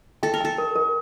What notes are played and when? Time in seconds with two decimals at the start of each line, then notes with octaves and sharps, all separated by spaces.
0.23 A4 G5
0.34 A#4
0.41 A4 G5
0.58 A#4
0.76 A#4